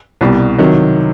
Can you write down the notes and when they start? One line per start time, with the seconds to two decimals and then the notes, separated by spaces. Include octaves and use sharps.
0.21 C2 B2 G3
0.59 C3 D#3 F#3